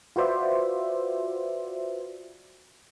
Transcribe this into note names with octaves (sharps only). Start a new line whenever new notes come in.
F4 F#4 B4 C5 D5 E5